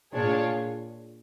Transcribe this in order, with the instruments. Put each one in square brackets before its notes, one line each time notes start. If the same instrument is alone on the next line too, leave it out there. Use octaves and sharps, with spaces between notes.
[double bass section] A#2 [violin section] D4 F4 G#4 C#5